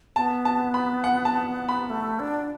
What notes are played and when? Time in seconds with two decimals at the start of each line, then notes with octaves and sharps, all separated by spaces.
0.16 B3 A5
0.45 A5
0.74 B5
1.04 F#5
1.25 A5
1.69 B5
1.90 A3
2.19 D4